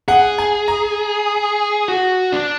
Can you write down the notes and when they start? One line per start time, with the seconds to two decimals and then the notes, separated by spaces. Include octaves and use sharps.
0.08 G#4 F#5
0.38 G#5
0.68 A#5
1.88 F#4
2.32 D4